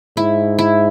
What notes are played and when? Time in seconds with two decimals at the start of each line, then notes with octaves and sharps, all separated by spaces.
0.17 G#2 E4
0.59 E4